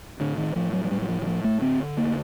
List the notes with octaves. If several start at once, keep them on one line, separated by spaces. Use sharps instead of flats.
A2 D3
D#3
A2 F3
F#3
F#3
A2 G3
F#3
F3
E3
A2 F3
A3
D3 C4
D2 A#3